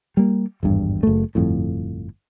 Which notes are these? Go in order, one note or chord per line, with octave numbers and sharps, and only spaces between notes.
G3 A#3
G#1 E2 G2
F#1 A3
G1 F2 A2